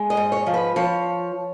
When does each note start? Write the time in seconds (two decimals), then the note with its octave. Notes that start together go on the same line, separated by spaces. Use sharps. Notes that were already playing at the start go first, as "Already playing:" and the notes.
Already playing: G#3
0.10 D#5
0.17 G#2
0.32 C#5
0.46 F3
0.54 B4
0.76 F3 C#5